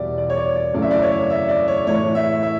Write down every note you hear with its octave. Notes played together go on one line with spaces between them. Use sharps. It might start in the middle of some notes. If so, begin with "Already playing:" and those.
Already playing: E2 B2 G3 D5 E5
D5
C#5
D5
D5
F#2 C#3 E3 A3 D5
E5
D5
C#5
E5
D5
C#5
A2 E3 A3 C#5
E5
E5